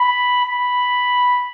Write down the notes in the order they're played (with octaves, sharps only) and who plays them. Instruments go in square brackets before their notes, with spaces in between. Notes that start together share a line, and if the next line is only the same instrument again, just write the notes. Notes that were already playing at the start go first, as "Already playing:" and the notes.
Already playing: [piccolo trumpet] B5
B5